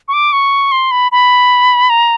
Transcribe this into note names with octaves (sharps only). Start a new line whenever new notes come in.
C#6
D6
C#6
C6
B5
B5
A#5